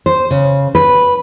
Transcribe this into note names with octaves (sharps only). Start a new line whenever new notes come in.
C5
C#3
B4